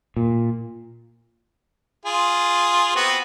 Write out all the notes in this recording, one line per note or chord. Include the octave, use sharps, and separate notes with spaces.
A#2
F4 G#4
B3 C4 F#4